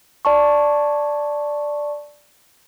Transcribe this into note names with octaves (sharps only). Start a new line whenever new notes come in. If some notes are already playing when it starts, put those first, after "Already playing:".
D5 A5 C#6